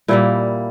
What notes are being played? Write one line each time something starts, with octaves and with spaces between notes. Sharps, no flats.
A#2 G3 A#3 E4